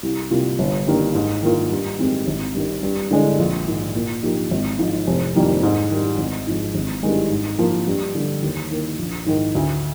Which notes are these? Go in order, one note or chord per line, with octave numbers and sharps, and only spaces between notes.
C2
C3 G3 A#3 F4
G1
G2 D#3 A#3
G#2
D#3 A#3 F4
G2
D#3 G#3 C4 G4
G#1
G2 D#3
G2
D3 G#3 D4
A#1
G#2 D#3
A#2
F3 A#3 D#4 G4
G#1
G#2 F3
F1
F2 D#3 G3 A#3
G#2
D#3 G3
G#1
G#2 F3 G#3
G#1
G2 D#3 G#3
G#2
F3 A#3
G2
D3 G3
D#2
D#3 A#3
A#1
G#2 D#3
D2